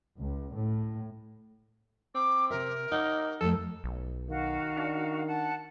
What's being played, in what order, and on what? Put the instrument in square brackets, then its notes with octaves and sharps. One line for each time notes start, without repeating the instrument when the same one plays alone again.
[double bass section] C#2
A2
[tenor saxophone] C4 [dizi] D6
[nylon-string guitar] C3 E5 [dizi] A#4
[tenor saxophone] D#4 [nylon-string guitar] F#5
[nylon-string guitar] F2 A3 [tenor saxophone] A4
[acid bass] B1
[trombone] D#3 [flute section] F#4 F5
[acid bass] D4
[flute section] F#5 A5